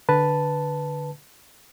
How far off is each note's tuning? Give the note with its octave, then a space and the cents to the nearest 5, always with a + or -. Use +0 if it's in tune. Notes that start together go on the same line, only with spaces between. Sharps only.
D3 +0 B4 +0 A5 +0